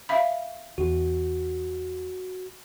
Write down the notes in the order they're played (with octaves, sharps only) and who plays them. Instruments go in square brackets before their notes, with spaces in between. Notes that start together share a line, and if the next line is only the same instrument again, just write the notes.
[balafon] E5 F5 B5
[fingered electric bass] E2 [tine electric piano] F#4